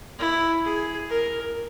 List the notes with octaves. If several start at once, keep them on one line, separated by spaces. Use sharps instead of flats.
E4
G#4
A#4